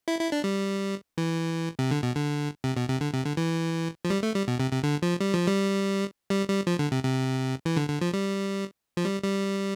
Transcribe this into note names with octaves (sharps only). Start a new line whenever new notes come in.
E4
E4
D4
G3
E3
C3
D3
B2
D3
C3
B2
C3
D3
C3
D3
E3
F3
G3
A3
G3
B2
C3
C3
D3
F3
G3
F3
G3
G3
G3
F3
D3
C3
C3
E3
D3
D3
F3
G3
F3
G3
G3